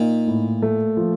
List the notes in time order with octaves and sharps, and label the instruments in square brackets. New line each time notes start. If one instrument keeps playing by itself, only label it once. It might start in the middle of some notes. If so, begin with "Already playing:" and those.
Already playing: [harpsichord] A#2 [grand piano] D#4
[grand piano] A2
A3
F3